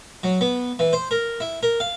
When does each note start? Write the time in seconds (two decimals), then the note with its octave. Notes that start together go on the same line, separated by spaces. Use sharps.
0.23 F#3
0.41 B3
0.79 E3
0.93 C5
1.11 A#4
1.40 E4
1.63 A#4
1.80 F5